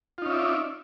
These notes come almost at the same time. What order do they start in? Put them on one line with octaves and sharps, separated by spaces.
F4 D#4 C#4 E5 D5